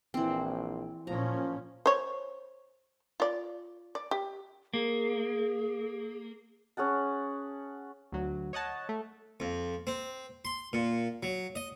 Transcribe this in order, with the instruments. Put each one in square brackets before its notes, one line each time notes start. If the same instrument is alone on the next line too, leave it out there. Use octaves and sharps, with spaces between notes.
[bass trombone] A#1 [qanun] E3 C4
[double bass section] A#2 C#4 [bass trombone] F3 [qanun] A#5
[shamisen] C5 C#5
F4 D5
D5
G4
[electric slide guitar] A#3 [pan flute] G#4
[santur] C#4 G#4 F#5 A5
[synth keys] D2 F#3
C#5 D#5 F#5 A5
A3
[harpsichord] F2
C4
C6
A#2
F#3
D#5